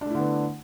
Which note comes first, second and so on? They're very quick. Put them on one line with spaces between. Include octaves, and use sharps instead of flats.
D4 A3 E4 D3 B3